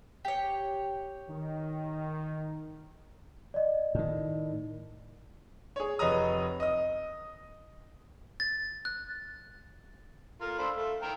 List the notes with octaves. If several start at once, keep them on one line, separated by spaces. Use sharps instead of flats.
G4 C#5
D#3
D5 D#5
A2 D#3
G#4 C#5
F1 B4 C#5 D#5 A#5 D#6
D#5 D#6
A6
F#6
F4 A4 A#4
D4 C5 F5 B5 E6
A3
G5 A#5 F6